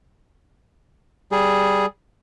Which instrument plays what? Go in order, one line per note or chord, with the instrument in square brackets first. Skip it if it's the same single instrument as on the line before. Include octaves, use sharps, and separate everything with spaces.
[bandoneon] G3 G#4